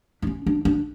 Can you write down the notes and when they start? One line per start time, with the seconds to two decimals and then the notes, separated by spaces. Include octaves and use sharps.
0.22 D4
0.27 C#4
0.46 D4
0.65 D4